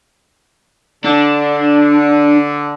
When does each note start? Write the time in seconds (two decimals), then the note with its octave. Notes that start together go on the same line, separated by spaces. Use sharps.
1.04 D3 D4